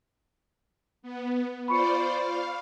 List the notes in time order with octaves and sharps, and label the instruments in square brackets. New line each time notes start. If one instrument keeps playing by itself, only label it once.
[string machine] B3
[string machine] F4 C5 D5 [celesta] B5 C#6 C#7
[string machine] F5